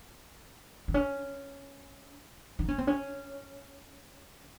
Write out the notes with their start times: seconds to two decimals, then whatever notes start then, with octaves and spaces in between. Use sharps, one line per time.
0.88 C4
0.94 C#4
2.59 D#4
2.68 C#4
2.78 C4
2.87 C#4